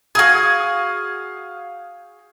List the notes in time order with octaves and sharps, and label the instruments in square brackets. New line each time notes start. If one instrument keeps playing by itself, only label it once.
[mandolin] F#4 G#4 [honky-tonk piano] F5 D#6 G#6